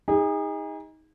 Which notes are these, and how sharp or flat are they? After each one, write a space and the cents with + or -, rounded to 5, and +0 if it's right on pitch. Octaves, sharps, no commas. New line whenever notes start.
D#4 +20 G#4 -35